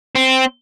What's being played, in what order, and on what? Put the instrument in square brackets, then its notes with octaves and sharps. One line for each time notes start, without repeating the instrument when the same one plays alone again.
[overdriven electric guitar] C4